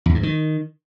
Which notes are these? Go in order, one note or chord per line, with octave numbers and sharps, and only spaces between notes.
E2
G2
D#3